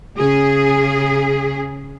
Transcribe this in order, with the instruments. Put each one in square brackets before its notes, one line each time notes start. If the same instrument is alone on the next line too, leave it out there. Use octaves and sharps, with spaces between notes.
[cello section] C#3 G#4